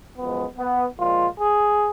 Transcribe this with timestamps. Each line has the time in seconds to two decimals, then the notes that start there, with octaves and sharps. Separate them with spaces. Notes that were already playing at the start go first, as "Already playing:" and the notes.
0.16 F#2 F3 G#3 B3
0.57 B3
0.98 A#2 F3 G#3 F4
1.38 G#4